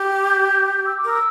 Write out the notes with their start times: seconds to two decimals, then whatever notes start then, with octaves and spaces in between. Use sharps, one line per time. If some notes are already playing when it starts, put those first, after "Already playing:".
Already playing: G4
0.29 G6
0.86 E6
0.97 D6
1.04 A#4
1.10 E6